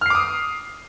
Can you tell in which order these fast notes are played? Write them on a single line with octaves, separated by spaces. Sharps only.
F6 C7 D6 D#6